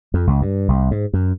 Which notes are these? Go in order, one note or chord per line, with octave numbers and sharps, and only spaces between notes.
F2
C#2
G2
C2
G#2
F#2